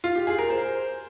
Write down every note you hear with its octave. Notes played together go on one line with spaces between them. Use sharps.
F4
G4
G#4
A#4
C5